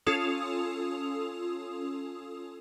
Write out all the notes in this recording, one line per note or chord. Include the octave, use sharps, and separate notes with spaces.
C#4 F4 A4 D#6 F7